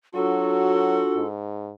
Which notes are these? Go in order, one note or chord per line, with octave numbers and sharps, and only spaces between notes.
F#3 D4 F4 F#4 A4
G#2